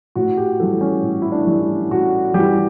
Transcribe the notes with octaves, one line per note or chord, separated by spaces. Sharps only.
A2 F#4
G4
E3 G3 A4
C#4
A2
E4
D4
E3 G3
E4
A2 F#4
E3 G3 G4